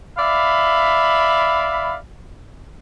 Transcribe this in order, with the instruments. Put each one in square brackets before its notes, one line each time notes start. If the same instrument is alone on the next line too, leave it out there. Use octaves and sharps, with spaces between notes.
[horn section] D5 E5 F5 B5